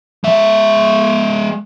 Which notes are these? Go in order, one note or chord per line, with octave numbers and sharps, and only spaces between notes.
G#3 E5